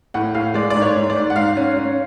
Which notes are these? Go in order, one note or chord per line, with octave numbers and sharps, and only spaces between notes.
A2 F#5
A2 F5
G#3 D5
D5
G#2
C#5
G#2
D5
G#2
F#5
G#2 F5
C#4
C#4